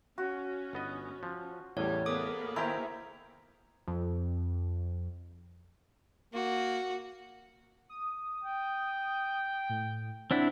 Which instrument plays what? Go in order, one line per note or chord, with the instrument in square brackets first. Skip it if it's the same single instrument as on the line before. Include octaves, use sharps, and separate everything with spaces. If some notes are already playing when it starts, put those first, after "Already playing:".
[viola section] C#4 [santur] F#4
[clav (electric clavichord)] G1 B3 D#5
F3
[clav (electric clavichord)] A1 E2 A2 [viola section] G3 [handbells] C#5
[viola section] A#3 B3 G#4 [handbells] A4 D6 D#6
[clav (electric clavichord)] D#3 G5 [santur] E4 G#5 [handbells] C5 E5 A#5
[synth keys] F2
[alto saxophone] A#3 [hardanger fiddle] F#4
[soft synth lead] D#6
[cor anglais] G5
[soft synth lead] A2
[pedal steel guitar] C4 D4 E4 [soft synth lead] F#5